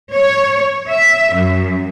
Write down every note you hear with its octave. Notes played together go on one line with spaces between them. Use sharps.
C#5
E5
F#2